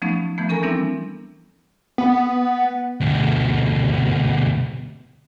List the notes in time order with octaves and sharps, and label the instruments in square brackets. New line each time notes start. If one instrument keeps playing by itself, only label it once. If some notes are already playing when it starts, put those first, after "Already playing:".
[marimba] F3 F#3 A3 B3 C#4 D#4
E3 F3 A3 B3
C#4 A4 A#4 G#5 A#5
E3 G3 B3 C4 D4 E4
[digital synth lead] B3
[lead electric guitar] D2 B2